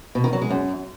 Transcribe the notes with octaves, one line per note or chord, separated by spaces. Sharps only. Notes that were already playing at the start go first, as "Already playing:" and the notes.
B2
D#3
F#3
G#3
F#2